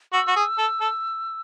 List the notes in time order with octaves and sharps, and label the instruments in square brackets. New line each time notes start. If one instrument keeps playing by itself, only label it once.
[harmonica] F#4 [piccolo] E6
[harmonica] F#4
G#4
A4
A4